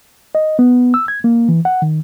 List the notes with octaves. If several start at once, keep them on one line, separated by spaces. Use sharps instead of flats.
D#5
B3
E6
G#6
A#3
E3
F#5
D#3